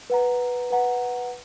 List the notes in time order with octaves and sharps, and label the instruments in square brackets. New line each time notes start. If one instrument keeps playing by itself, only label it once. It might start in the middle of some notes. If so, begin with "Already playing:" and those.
[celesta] B4 F#5 A#5
B4 F#5 A#5